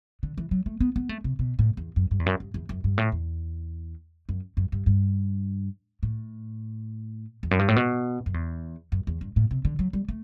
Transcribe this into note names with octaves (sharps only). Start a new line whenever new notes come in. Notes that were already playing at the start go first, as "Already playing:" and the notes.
D3
E3
F#3
A3
B3
B3
A3
C3
B2
A2
E2
F#2
G2
E2
F#2
G2
E2
F#2
G2
A2
E2
F#2
F#2
G2
G2
A2
E2
F#2
G2
A2
B2
F#2
E2
F#2
E2
G2
A2
C3
D3
F#3
G3
A3